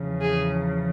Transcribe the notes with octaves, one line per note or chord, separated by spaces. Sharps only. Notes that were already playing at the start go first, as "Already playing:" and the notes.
Already playing: E2 C#3 F3
G#4